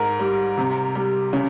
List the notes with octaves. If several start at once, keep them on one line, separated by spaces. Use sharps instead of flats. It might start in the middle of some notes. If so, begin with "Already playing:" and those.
Already playing: G#2 A#4
G3
C3
G3
C#3